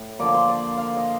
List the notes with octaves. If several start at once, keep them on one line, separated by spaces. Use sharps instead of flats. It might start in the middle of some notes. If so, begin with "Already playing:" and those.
Already playing: A2
D3 F3 A#3 D5
C5
D5
F5
D#5